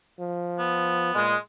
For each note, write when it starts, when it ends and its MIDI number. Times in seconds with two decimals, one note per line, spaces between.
0.19 1.11 53
0.59 1.32 59
1.15 1.35 46
1.15 1.36 56